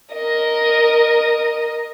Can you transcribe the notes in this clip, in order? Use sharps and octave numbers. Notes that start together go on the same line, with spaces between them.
A#4 D#5